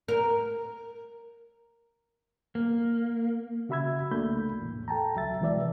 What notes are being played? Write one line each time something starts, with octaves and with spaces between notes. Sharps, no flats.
A#4
A#3
C#3 F#4 E5 B5 E6 G#6
C2 A3 A#3 D4 B5 G6
E2 A2
A4 G5 A5 A#5
C#2 F#3 E5 A6
C3 E3 G#3 B4 D5 E5